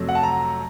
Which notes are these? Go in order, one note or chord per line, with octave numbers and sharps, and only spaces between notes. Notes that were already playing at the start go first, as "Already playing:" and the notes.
Already playing: F2 C3 F#3 A3
F#5
A5
A#5